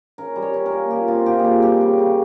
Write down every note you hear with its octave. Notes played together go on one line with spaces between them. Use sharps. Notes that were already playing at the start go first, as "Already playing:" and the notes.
C#4 A#4
G3
C#5
C#4
A#4
A#3
A#2 G4
C4 F4
A#2 G4
G#4
G3 G4
G3 G4
C#3
C#3